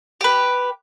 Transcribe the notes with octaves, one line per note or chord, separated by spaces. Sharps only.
G4 B4